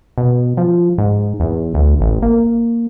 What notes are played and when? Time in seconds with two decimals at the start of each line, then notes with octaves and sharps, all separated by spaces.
0.18 B2
0.57 F3
0.98 G#2
1.40 E2
1.74 D2
2.00 A1
2.22 A#3